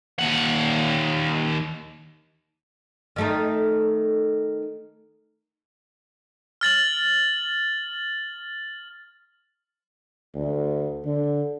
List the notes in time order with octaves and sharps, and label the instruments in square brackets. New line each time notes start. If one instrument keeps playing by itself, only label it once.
[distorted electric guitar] D#2 F#5
[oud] D#3 A3 D#4
[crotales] F6 A6 F#7
[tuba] D2
D3